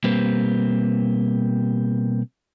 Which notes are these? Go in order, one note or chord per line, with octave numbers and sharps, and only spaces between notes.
B2 G3 A#3 C4 G4 B4